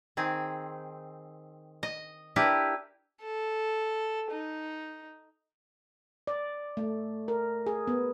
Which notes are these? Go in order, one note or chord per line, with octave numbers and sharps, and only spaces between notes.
D#3 C4 G#4
D#5
D4 E4 G4 A#4 B4
A4
D#4
D5
A3
A#4
G#4
B3